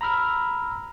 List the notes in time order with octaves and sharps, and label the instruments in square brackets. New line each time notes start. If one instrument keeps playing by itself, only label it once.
[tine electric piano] A#5 B5 E6 F6